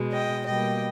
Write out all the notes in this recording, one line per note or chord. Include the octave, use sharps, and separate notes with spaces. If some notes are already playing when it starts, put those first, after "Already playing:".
Already playing: B2 G#3
D#5 G5
B2 G3 A#3 D#5 G5